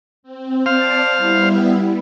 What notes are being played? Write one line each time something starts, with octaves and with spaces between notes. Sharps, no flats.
C4
C5 D5 F5 A5
G3 B3 E4